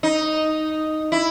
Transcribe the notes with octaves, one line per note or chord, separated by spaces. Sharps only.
D#4
E4